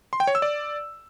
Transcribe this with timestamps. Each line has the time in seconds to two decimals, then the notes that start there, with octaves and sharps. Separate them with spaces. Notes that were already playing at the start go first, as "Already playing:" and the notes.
0.13 C6
0.20 G5
0.27 C#5
0.35 E6
0.42 D5